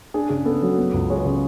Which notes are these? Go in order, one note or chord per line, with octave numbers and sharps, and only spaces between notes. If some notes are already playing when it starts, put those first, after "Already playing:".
D4 G#4
C#3 G#4
B3 A4
F#3
B3
C#2
G#3 C#5
B4
C#3 C#5